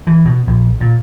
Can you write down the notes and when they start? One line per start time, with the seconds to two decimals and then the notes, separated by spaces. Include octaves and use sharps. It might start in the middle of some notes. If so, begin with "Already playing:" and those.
0.07 E3
0.25 B2
0.47 A#1
0.81 A#2